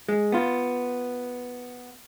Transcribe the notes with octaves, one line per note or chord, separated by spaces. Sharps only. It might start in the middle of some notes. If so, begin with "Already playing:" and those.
G#3
B3 F4